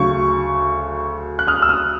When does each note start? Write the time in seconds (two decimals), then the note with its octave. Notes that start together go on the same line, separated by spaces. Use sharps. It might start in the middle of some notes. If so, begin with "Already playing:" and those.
Already playing: D2 C#3 F#3 C#6
1.39 F#6
1.47 D#6 F6
1.62 E6
1.69 D#6 F6